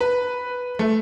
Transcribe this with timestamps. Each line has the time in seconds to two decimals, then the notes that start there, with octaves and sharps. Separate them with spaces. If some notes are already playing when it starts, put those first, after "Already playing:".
0.01 B4
0.79 A3